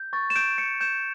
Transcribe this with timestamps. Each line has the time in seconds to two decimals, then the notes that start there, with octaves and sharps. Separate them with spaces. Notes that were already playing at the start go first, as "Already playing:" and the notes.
Already playing: G6
0.13 C#6 A6
0.30 E7
0.36 G6 D7
0.58 C#6 C#7
0.81 G6 E7